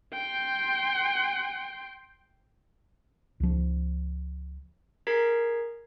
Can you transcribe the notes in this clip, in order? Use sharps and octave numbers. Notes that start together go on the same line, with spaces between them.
G5 C6
C#2 F3
G#4 A#4 A#5 G#6 B6 C7